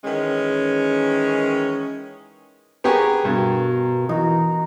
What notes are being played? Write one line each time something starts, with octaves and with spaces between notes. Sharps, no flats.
D#3 E3 G#3 C#4
B3 G4 G#4 A#4 C#6
G2 B2
E3 D#4 F#4